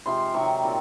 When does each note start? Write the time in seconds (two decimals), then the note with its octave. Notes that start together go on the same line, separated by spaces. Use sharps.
0.06 C3 F3 G#3 C6
0.34 C3 D#3 F#3 C#6
0.62 A#2 G3 C4